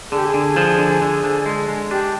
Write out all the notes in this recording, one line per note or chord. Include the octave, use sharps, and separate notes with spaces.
D3 G#4
G4
G#4
D3
F3
D3
D3
D3
G#3
G#3
D4 G4